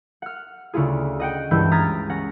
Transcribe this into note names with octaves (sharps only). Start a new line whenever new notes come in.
F#5 F6
D2 C#3 C#4 E4 F4 G#4
D#5 F#5 G5
C#2 G2 E3 E4 G6
A#5 D#6 F6 G#6 A6 B6
C#4 F#5 A#6